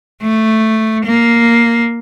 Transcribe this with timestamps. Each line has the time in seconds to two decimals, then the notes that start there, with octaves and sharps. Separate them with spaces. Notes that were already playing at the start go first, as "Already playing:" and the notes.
0.22 A3
1.05 A#3